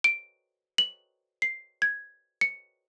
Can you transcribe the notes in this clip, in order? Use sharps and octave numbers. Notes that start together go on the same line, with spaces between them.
D7
F#7
C7
G#6
C#7